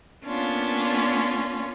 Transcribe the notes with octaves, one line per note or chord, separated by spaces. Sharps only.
A#3 B3 C#4 D4 F4